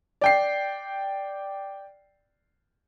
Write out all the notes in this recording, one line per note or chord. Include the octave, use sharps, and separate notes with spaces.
D5 G5 C7